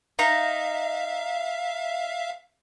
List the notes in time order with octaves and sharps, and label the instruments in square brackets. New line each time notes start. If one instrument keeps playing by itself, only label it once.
[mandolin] D#4 A#5 [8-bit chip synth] E5 F5